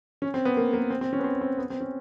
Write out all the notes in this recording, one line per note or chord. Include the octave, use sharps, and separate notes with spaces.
C#4
C4
B3
A#3
A#3
C4
C4
C#4
B3
C4
C4
B3
C4
C#4